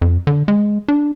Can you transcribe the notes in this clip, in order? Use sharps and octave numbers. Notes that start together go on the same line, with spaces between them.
F2
D3
G#3
D4